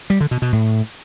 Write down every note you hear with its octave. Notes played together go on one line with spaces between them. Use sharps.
G3
D3
B2
B2
A2